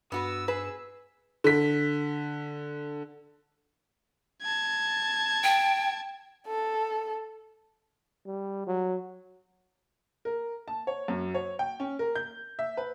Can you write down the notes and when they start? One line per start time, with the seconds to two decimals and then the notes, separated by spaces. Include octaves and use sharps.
0.12 G2 B3 F#4 B4 E6
0.48 G#4 B4
1.44 D3 B6
4.42 A5 G#6
5.44 G5
6.47 A4
8.26 G3
8.67 F#3
10.25 A#4
10.68 A5
10.87 C#5
11.08 F#2
11.34 C#5
11.59 G5
11.80 C#4
11.99 A#4
12.15 G6
12.59 E5
12.77 B4